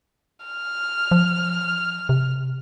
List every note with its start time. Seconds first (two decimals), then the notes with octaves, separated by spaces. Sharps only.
0.46 F6
1.11 F3
2.09 C3